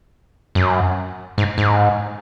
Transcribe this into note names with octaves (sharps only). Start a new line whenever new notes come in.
F#2
G#2
G#2